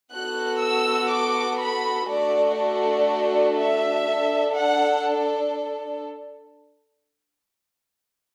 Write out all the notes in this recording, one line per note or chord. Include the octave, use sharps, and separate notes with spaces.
B3 F#4 A4 F#6
E6
D6
B5
A3 D4 F#4 A4 D5
D5
E5
D4 A4
F#5